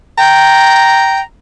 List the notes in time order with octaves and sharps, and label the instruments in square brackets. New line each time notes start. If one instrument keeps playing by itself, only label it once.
[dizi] G5 [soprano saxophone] A#5